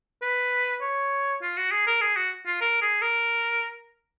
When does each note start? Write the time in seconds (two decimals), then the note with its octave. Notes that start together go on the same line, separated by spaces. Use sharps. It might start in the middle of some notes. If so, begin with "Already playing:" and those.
0.22 B4
0.81 C#5
1.42 F4
1.57 F#4
1.71 G#4
1.87 A#4
2.01 G#4
2.16 F#4
2.46 F4
2.61 A#4
2.81 G#4
3.02 A#4